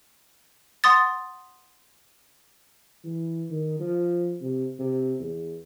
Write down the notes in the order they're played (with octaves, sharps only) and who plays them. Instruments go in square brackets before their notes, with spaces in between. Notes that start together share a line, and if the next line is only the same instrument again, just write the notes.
[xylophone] F#5 C6 D#6 A6
[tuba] E3
D#3
F3
C3
C3
E2